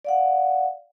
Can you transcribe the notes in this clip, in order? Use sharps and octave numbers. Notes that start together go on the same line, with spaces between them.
D5 F5 F#5